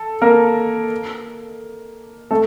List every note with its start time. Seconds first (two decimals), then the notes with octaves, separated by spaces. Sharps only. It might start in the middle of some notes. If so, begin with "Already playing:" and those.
Already playing: A4
0.22 A#3 A#4
2.31 A3 A4